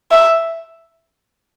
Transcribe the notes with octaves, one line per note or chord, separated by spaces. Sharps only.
E5